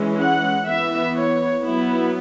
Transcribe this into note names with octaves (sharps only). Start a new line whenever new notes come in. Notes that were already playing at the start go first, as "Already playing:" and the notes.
Already playing: E3 G#3 C#4
F#5
E3 B3 E5
C#5
F#3 B3 E4